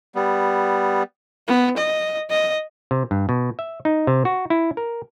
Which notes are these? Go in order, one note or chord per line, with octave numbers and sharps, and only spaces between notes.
G3 B3
B3
D#5
D#5
C3
G2
B2
E5
D#4
C3
F#4
E4
A#4